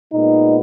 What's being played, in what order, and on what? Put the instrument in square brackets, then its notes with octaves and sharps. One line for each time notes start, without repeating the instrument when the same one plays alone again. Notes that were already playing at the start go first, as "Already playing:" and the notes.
[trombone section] A#2 G#3 B3 D#4